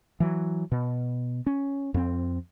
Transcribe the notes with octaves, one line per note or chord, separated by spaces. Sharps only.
E3 F#3
B2
C#4
F2 C4